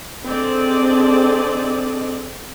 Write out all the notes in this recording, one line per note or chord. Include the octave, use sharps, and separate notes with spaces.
C4 D4 G#4 A4 D5 D#5